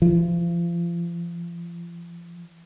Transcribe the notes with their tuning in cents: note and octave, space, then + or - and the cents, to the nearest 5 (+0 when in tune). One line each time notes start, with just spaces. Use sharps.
F3 -35